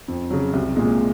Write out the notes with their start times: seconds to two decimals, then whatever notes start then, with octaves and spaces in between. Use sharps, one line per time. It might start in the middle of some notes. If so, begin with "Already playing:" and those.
0.08 F2
0.30 C#3 F#3
0.53 C2
0.76 A#2 G#3